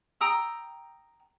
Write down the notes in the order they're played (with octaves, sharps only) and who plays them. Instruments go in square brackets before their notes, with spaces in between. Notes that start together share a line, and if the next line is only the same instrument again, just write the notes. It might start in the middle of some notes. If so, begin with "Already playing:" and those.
[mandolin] G5 A#5 D#6 E6